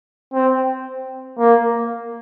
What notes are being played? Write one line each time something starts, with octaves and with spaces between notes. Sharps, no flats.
C4
A#3